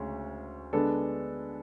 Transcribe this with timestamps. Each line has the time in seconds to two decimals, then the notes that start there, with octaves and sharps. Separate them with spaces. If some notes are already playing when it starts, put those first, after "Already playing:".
Already playing: D2 C#3 G#3 C#4
0.73 D3 G#3 B3 D4 A4